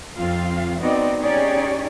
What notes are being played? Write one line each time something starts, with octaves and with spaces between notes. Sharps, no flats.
F2 C4 F4 F5
B3 C4 D#4 F#4 D5 D#5
C#4 D#4 G4 G#4 C#5 D5